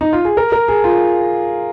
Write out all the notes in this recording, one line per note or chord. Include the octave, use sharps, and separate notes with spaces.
D#4
F4
G#4
A#4
A#4
G#4
F4